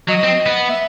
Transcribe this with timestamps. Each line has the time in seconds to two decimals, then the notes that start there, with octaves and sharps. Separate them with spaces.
0.08 F#3 D#5
0.24 C4
0.46 B3
0.69 E5